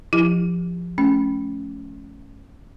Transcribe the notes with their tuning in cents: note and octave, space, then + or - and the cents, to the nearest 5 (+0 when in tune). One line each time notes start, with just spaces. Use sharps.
F3 +0 E4 +0 G4 +15
A3 -30 C#4 +0